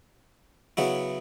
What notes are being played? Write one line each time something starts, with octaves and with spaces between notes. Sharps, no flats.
C#3 F#3 B3 E4